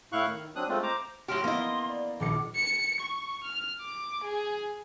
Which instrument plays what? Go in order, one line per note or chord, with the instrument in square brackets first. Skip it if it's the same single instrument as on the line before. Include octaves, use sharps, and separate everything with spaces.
[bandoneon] A2 E4 F5 C#6 F#6
D#3
F#3 C4 D4 D#6 F#6
G#3 A3 C4 F4
C5 A#5 D6
[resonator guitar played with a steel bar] A2 F#3 G4 [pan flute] C6 [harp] F6
[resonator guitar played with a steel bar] A#3 D#5 [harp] B3 E4
[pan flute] D5
[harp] D#1 A#1 C#7 [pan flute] D6
[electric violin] C#7
C#6
F6
D6
G#4